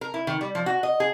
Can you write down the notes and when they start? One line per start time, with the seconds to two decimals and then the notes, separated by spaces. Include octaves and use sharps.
0.01 A#4
0.14 E4
0.27 D#3
0.41 G3
0.55 F3
0.66 F#4
0.83 D#5
1.00 G#4